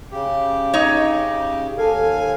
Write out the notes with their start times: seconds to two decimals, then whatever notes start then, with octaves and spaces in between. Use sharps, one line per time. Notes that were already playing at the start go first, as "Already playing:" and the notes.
0.12 C#3 G4
0.74 D#4 C#5
1.78 D#2 A4 F5 G#5